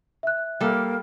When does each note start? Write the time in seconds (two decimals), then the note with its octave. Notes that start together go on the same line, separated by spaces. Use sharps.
0.23 E5 F#6
0.61 G3 A#3 A4